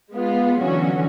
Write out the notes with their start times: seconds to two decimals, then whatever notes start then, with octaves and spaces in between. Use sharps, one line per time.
0.11 G#3 B3 F4
0.59 D3 E3 F#3 C#4 F#4